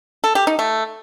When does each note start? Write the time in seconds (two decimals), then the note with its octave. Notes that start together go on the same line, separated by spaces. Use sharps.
0.24 A4
0.35 G4
0.47 D#4
0.59 A3